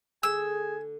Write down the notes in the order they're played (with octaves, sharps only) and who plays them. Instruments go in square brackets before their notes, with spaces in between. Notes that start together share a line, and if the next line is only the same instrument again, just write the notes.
[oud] D3 A3 [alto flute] G#4 [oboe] G#5 [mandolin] E6